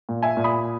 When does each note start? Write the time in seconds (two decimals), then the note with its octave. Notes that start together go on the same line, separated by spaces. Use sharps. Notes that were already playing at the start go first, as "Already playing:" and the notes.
0.09 A#2
0.23 E5 G#5
0.37 A#2
0.44 B5 D#6